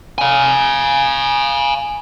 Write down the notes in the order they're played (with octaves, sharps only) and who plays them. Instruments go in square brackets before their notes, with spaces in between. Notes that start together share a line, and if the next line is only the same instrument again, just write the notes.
[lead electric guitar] F5 G#5